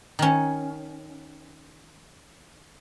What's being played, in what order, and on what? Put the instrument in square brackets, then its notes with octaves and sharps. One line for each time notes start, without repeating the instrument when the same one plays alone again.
[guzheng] D#3 C#4